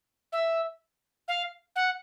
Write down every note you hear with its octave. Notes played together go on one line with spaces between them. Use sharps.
E5
F5
F#5